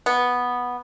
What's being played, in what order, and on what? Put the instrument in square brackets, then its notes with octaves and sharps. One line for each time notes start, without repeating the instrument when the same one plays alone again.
[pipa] B3